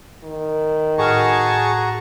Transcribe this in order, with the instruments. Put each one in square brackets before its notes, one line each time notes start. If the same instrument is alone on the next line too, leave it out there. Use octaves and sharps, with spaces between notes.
[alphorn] D#3
[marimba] A2 F6 [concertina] F#4 A#5 [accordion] G#4 A5 C#6